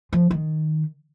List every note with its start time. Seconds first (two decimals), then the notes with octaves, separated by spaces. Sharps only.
0.13 F3
0.31 D#3